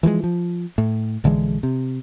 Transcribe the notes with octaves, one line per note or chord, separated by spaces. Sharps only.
E3 F3 G3 G#3
F3
A2
A#1 D3 E3 G#3
C3